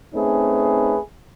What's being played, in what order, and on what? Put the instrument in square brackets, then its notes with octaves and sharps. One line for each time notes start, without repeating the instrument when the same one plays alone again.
[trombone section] A3 C4 C#4 D#4 G#4 B4